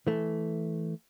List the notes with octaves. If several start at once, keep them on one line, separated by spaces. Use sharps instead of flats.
E3 A3